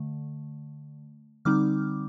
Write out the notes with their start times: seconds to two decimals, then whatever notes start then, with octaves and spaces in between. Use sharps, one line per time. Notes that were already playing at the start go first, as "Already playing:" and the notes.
Already playing: D3 A3
1.45 D3 G3 C4 D#4 D6 F6